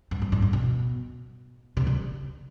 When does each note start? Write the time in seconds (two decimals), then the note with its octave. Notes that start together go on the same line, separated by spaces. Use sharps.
0.11 G2
0.22 G#2
0.32 G#2
0.42 G2
0.53 B2
1.77 C3
1.87 D3